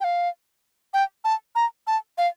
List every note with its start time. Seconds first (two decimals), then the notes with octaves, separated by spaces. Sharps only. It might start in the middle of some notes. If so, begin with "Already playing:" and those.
0.01 G5
0.04 F5
0.94 G5
1.24 A5
1.55 A#5
1.87 A5
2.18 F5